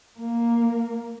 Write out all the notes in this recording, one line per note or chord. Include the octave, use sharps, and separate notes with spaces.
A#3